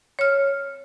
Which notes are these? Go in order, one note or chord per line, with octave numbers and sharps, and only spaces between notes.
C#5 F6